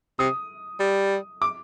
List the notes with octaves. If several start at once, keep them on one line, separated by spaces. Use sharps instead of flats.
C3 D#6
G3
D6